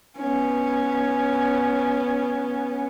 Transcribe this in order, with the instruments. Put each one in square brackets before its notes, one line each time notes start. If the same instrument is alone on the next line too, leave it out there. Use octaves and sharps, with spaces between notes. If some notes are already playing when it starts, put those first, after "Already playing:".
[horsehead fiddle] B3 C#4